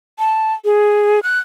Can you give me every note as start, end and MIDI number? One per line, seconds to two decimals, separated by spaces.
0.19 0.54 81
0.65 1.20 68
1.23 1.39 90